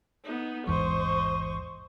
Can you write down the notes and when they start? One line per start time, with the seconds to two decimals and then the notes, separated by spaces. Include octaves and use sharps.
0.25 B3 D#4
0.67 A1 E2 G#2 C5 D#5 C#6